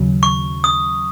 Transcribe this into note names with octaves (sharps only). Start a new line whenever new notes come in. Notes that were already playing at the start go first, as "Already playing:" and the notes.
Already playing: D#2 C#3 F#3
C#6
D#6